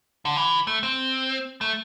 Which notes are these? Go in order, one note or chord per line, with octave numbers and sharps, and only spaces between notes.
D3
E3
A3
C4
A3